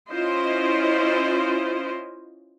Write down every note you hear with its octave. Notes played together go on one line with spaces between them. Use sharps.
C#4 E4 F4 C5 D#5